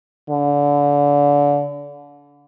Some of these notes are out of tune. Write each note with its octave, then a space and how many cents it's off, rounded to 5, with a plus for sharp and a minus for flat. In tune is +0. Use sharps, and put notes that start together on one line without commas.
D3 -30